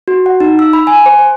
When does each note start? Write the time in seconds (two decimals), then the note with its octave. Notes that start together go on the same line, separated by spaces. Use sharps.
0.08 F#4
0.26 F#5
0.40 D#4
0.59 E6
0.73 B5
0.87 G#5
1.06 C5
1.19 C5